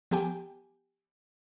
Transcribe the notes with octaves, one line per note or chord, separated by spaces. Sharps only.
F3 B3 G4 G5 G#5